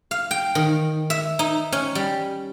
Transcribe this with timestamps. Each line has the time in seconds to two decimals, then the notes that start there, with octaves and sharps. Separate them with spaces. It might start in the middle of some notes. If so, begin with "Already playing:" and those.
0.11 F5
0.31 G5
0.55 D#3
1.10 E5
1.39 D#4
1.72 C#4
1.95 G3